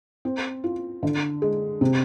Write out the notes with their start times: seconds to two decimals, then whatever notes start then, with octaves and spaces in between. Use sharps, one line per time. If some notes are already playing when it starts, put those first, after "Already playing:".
0.25 C4
0.64 F4
1.03 D3
1.42 G#3
1.81 C3